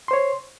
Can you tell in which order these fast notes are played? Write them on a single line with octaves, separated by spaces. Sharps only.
C6 C5 C#5